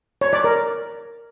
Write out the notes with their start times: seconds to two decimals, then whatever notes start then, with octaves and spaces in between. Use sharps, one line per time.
0.21 C#5
0.33 D5
0.44 A#4